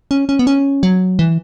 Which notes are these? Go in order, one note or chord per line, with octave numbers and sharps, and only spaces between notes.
C#4
C#4
B3
C#4
F#3
E3